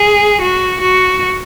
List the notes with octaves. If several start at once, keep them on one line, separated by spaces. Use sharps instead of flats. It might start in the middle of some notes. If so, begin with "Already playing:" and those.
Already playing: G#4
F#4
F#4